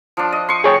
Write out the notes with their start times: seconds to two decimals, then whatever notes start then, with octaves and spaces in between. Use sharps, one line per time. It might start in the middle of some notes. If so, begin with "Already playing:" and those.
0.17 F3 D4
0.32 D#5
0.49 C6 C#6
0.64 G#4 C#5 G5